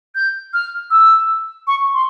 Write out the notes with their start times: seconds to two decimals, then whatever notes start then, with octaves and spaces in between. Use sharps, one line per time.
0.15 G6
0.53 F6
0.91 E6
1.67 C#6
1.94 C6